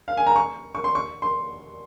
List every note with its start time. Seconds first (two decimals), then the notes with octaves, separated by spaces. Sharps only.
0.08 F5
0.17 G#5
0.27 A#5
0.36 C#6
0.75 C#6
0.84 C6
0.95 C#6
1.22 C6